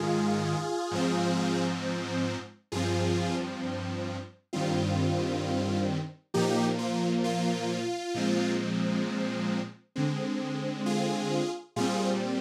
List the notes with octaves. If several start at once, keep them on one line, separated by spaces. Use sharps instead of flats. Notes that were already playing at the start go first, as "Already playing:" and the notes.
Already playing: G#2 D#3 G#3 F4 G#4
G#2 F3 C4
G2 F3 C4 F4 G#4
G2 D#3 G3 C4 F4
A#2 F3 A#3 D#4 G4
F4
F4
A#2 F3 G#3 C4
D3 G#3 C4
F4 G#4
A#2 G3 C4 F4 G#4